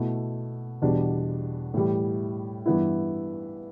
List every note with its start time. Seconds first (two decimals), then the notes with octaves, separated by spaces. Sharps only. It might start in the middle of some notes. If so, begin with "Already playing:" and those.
Already playing: B2 A3 E4
0.82 E2 B2 G3 D4
1.74 A2 E3 G3
2.66 G2 E3 B3 E4